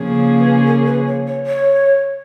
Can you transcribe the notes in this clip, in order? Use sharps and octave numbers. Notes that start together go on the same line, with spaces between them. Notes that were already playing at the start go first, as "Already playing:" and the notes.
Already playing: C#3 F3 A#3 C#4 G#4
B4
A#4
B4
C#5
C#5
C#5